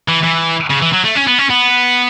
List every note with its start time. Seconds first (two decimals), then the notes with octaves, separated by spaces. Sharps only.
0.09 E3
0.24 E3
0.70 C#3
0.81 E3
0.93 F#3
1.04 A3
1.15 C#4
1.27 B3
1.38 C#4
1.50 B3